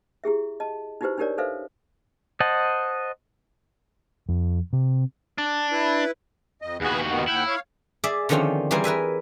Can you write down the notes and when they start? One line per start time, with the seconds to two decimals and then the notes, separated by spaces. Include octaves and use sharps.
0.24 E4 G4 G#4 E5
0.60 D#5 A5
1.01 D#4 E4 F#4 G4 B4 C5
1.18 D4 D#4 G4 A#4 C#5 D5
1.38 D#4 A4 B4 C5 E5 F5
2.40 C5 D#5 F#5 A5
4.29 F2
4.73 C3
5.38 D4
5.72 E4 B4
6.62 F2 D#5
6.81 D#2 B3 F#4 G#4 B4
7.09 B2 D#3 B3
7.28 D#2 E4 F#5 G5
7.47 C#5 F5
8.04 G#4 D5 E5
8.29 D3 D#3 F3 C4 C#4 F4
8.71 E3 G3 G#4 A#4 C5
8.84 A#4 B4 E5 G#5